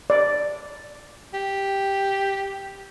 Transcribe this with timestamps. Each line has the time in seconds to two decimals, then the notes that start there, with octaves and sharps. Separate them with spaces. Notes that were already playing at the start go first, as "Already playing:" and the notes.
0.10 D5
1.34 G4